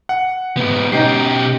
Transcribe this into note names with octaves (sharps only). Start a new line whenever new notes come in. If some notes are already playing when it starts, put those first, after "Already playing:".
F#5
G#2 B3
B2 C#4 D#4 G4 C7